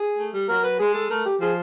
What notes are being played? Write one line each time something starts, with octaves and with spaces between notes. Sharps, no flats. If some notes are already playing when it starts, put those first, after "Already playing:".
Already playing: G#4
A3
G3
F#3 A#4
B4
G#3 G#4
A4
A3 A#4
G4
F3 G#4